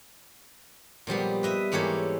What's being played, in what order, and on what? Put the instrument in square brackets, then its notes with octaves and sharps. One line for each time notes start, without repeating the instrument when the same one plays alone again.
[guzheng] A#2 F3 G3 B3
B4 D#5 E5
G#2 E3 A#3 G4 A4 C#5